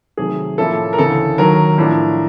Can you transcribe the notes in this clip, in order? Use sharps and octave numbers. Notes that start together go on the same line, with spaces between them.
C3 D#3 F#3 A3 G#4
A2 F3 A#3 C#4 E4 A4
A#4
D2 C#3 E3 A4
D#2 D#3 F#3 A#4
A2 F3 A3 D4